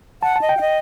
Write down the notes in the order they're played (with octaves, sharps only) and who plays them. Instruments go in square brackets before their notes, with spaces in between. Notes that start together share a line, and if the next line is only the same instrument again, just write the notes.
[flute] F#5 [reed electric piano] A5
[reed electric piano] A5
[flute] D#5
[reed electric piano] G5
[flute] F#5
D#5